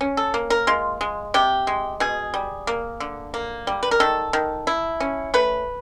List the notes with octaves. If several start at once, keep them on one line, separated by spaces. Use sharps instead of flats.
C#4
A4
A#3
A#4
G#3 F4
G#3
C3 G4
G#3
B2 G#4
G3
A#3
D3
A#3
G3
B4
A#4
D#3 A4
D#3
E4
C#4
A3 B4